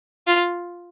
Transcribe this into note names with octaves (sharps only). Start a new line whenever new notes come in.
F4